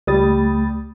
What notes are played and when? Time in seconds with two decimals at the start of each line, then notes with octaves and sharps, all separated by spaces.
0.07 C#2 G3 A3 G4 B5 D#6 A6